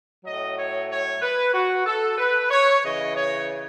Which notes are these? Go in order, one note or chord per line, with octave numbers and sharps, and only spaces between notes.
A2 F#3 D#5
C#5
C#5
B4
F#4
A4
B4
C#5
C#3 E3 D#5
C#5